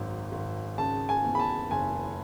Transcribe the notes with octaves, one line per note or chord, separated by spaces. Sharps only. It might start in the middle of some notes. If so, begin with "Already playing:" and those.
Already playing: G#1 F#2
G#1
C#3 A5
G#5
E2
B5
A5
F#1 G#5